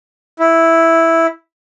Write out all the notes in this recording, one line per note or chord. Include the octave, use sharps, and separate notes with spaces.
E4